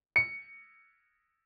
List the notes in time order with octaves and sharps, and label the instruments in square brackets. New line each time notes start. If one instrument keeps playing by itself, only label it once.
[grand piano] C#7